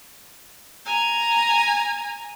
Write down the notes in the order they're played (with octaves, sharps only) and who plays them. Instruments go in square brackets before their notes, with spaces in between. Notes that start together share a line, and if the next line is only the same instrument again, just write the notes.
[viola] G#5 A#5